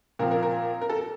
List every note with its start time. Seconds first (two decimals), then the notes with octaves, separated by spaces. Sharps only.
0.19 A#2 F3 C4 A#4
0.31 A#4
0.43 A#4
0.81 A#4
0.90 A4